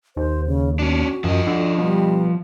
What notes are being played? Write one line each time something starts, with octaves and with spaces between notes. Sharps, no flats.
D#2 C5
C#3
C#4 D4 F#4
F#2 F3 D#5
D3
B2 G3